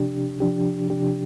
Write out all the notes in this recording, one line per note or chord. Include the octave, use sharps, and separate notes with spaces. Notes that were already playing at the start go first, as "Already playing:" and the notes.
Already playing: C3 F3 D4 G4
C3 F3 D4 G4
C3 F3 D4 G4